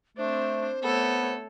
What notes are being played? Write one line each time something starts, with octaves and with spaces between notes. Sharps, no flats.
A3 C4 D4 C5
A3 B3 A4 C#5